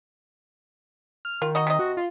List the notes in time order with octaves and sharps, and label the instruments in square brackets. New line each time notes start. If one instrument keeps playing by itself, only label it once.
[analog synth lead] F6
[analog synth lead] D#3 [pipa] F4
[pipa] D#4 F#4 D#5
C3 D#5
[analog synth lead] F#4
F4